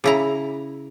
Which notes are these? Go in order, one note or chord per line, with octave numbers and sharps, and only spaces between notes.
C#3 E4 A#5